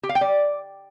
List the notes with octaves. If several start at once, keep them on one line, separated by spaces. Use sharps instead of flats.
G4
F5
G5
D5